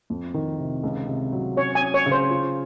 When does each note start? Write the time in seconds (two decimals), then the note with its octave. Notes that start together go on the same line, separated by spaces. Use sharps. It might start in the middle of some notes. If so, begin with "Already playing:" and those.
0.10 F2
0.34 D#3
0.59 C3
0.83 C#2
1.07 C3
1.33 F#3
1.57 C#4 C#5
1.75 G#5
1.81 C#4
1.94 C#5
2.06 C#3
2.12 C5
2.30 F4